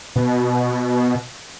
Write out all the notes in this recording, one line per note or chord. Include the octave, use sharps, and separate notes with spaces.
B2